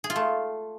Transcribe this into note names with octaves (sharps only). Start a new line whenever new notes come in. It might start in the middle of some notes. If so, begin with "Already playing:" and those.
G#4
F4
A3